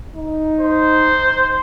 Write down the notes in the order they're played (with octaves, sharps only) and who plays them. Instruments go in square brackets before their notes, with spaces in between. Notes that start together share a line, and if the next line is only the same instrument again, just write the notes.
[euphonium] D#4
[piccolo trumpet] C5